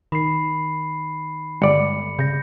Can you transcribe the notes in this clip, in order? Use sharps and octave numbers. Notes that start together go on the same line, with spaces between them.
D#3 B5 C7
G1 G#3 D5 C#7
C#3 G6 A#6